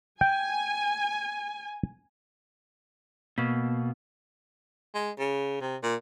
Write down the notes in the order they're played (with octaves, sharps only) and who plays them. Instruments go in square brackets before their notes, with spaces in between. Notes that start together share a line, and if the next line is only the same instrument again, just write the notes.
[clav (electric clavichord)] G5 [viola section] G#5
[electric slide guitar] B2 [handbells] A#3 B3
[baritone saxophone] G#3
C#3
C3
A#2